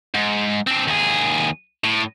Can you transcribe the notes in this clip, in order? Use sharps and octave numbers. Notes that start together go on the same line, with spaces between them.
G#2
C4 D4
D#2 G#4
A2